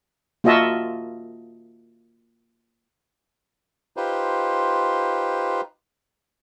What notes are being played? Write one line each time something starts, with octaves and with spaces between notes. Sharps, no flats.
A#3 F4 F#4 D#5 E5 A5
D#4 F4 G4 B4 C5